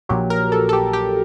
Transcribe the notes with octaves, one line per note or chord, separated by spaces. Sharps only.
A#1 A#2 F#3 G4
A#4
A4
A4
G4
G4